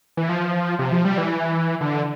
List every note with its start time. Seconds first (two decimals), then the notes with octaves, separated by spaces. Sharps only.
0.17 E3
0.29 F3
0.79 C3
0.92 F3
1.05 G3
1.18 E3
1.81 D3